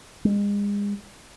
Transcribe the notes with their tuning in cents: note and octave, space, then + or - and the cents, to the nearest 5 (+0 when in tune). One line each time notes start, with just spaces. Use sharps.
G#3 -35